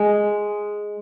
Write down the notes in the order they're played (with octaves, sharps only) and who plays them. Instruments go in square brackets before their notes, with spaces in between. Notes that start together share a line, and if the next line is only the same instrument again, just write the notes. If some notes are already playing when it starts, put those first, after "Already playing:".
Already playing: [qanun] G#3